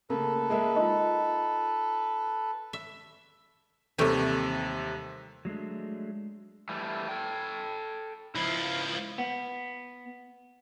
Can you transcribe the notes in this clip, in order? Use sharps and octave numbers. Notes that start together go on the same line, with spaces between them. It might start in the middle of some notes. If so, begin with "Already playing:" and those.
C#3 A3 A#3 A4 B4
G#3 A#3 E5
D#4 F4 D#5
E5
D#2 C3 E3 G3 A3
F#3 G#3 A3 D4
E3 G3 A3
A4 G5
C#2 F3 E4
B3